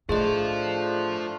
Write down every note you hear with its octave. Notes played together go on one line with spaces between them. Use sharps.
A2 A3 D4 F4 G#4 C5 D#5